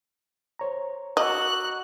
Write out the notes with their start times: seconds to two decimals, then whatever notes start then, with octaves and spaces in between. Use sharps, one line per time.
0.59 C5 C#5 A#5
1.17 F#4 D#5 A#5 D6 E6 F#6